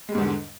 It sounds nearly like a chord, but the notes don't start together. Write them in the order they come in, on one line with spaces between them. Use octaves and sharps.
G#3 G3 G#2 E2 D3